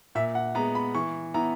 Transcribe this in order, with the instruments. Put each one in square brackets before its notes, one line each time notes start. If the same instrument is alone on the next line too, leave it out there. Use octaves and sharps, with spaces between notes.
[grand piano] A#2 E5
F#5
G#3 B3 A#5
B5
E3 C#6
B3 E4 A#5